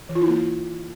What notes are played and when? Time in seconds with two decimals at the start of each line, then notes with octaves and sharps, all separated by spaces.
0.09 E3
0.15 F4
0.21 E4
0.28 A#3